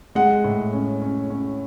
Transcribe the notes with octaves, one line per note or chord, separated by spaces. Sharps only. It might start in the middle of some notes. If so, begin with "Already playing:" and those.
G#3 F#5
A2
C#4
C#4
C#4